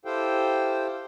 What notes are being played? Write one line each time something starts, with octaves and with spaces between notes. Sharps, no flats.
E4 G4 A4 C5 F5 G5